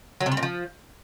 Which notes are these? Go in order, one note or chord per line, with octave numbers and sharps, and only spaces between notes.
F#3
C3
G3
A#2
F3